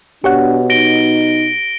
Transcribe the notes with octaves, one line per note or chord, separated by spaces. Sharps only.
B2 D4 G4 C#5 F#5
D#4 A#6 D7 G7